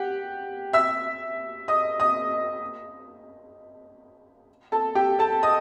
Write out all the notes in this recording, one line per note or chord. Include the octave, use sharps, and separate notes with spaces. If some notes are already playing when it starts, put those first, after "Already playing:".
Already playing: G4 F#5
E5 E6
D#5 D#6
D#5 D#6
A4 A5
G4 G5
A4 A5
D#5 D#6